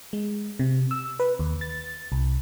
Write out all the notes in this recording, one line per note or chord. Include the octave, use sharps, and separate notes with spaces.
G#3
C3
E6
B4
D#2
A6
C2